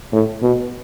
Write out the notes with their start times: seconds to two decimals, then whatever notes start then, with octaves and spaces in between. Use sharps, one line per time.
0.12 A2
0.42 B2